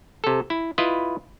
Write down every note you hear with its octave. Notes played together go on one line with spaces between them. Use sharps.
C3 A4
E4
E4 F4 B4 D#5